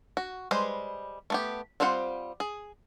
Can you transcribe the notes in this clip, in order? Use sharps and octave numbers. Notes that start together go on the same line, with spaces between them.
F#4
G3 G#3 B4 C5
A3 B3 G4
G3 C4 F4 C5 F#5
G#4